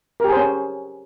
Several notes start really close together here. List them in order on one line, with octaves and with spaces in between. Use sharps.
A#4 G4 G#4 C5 C#4